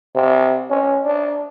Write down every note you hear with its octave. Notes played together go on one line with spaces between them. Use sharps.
C3
C#4
D4